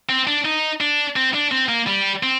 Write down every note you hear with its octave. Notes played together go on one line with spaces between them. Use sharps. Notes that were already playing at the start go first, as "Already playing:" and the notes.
C4
D4
D#4
D4
C4
D4
C4
A#3
G3
C4